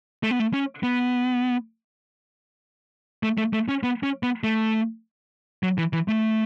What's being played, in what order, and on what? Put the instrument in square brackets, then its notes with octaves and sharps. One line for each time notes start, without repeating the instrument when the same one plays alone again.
[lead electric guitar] A3
B3
A3
C#4
B3
A3
A3
A3
C#4
B3
C#4
B3
A3
F#3
E3
E3
A3